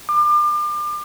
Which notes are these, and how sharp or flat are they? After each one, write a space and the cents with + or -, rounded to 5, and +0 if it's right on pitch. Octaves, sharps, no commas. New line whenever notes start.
D6 +35